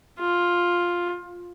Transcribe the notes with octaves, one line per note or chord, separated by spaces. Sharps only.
F4